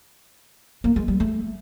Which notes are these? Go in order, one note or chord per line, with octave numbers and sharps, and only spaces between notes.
A#3
G#3
G3
A3